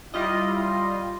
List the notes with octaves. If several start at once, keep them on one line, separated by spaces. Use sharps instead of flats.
G3 E4 F4 D#5
C6